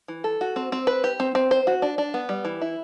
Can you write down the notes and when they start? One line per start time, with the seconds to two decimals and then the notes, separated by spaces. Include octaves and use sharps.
0.08 E3
0.24 A4
0.41 F#4
0.56 C4
0.72 C4
0.87 B4
1.04 G4
1.20 C4
1.35 C4
1.51 C5
1.67 F#4
1.82 D4
1.98 D4
2.14 B3
2.29 G3
2.45 E3
2.62 E4